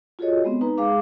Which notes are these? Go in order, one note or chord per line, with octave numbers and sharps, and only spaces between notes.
F4 F#4 G#4 A4 C#5 D#5
G#3 B3 C4
D#4 B4 A#5
G#3 G#4 F5 D6